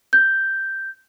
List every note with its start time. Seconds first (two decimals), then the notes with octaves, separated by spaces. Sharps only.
0.13 G6